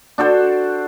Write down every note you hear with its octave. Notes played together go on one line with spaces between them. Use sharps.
D4 F#4 A4 C5